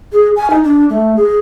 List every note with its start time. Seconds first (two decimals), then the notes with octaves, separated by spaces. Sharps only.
0.12 G#4
0.36 G#5
0.50 D#4
0.63 D4
0.89 A3
1.16 G#4